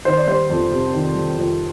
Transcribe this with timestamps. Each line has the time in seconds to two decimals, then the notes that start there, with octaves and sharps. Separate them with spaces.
0.05 D#3 C5
0.17 D5
0.27 G3 C5
0.50 F2
0.71 C3
0.93 D#3
1.14 G3
1.37 F2